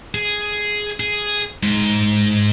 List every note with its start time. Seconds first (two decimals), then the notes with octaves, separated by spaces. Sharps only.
0.14 G#4
1.00 G#4
1.63 G#2